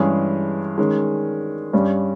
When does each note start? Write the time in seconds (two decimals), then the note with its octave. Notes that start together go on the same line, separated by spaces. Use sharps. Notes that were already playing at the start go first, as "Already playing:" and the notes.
Already playing: G2 E3 G#3 C#4 G#4
0.78 D#3 G#3 C#4
1.73 G2 G3 C#4